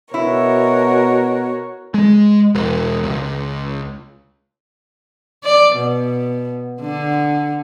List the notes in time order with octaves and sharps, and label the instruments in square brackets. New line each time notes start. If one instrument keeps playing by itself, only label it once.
[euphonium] B2 [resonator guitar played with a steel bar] E4 [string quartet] F#4 A#4 C#5
[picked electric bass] G#3
E1
C#2
[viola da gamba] D5
B2
D3